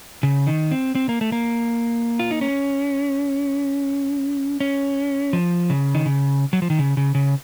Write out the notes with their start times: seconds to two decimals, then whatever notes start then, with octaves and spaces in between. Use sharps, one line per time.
0.23 C#3
0.47 D#3
0.71 C4
0.95 C4
1.09 A#3
1.21 A3
1.32 A#3
2.19 F4
2.31 D#4
2.41 C#4
4.60 C#4
5.33 F3
5.70 C#3
5.95 D#3
6.06 C#3
6.53 F#3
6.62 F3
6.70 D#3
6.79 C#3
6.97 C#3
7.15 C#3